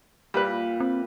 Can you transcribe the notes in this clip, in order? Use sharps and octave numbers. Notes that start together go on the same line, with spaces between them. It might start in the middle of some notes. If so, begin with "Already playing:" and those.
A#2 G3 E4 B4
C4